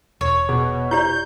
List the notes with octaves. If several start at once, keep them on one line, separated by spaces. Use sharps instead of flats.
E1 C#5
B2 G#4
E4 G4 D5 G6